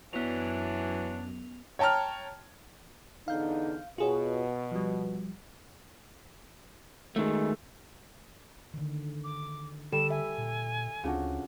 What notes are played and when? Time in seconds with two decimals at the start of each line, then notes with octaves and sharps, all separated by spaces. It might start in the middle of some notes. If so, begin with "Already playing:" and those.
0.13 F#2 E3 F#3 B3 D4 F7
1.79 C#5 G5 A5 A#5 F6
3.28 E2 D3 D#4 F5 G6
3.98 B2 F4 G#4 C#5
4.72 F3 G3
7.16 D#3 G#3 A3
8.74 D3 D#3
9.24 D6
9.92 D3 G3 A4 E7
10.10 E5 G#5
10.38 A#2
11.04 D2 C#3 C4 D4 F4 F#4